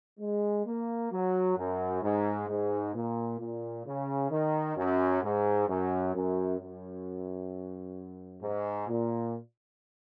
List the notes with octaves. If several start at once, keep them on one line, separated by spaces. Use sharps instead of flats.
G#3
A#3
F#3
F#2
G#2
G#2
A#2
A#2
C#3
D#3
F#2
G#2
F#2
F#2
F#2
G#2
A#2